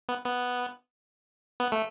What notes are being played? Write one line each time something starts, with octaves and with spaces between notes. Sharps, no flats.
B3
B3
B3
A3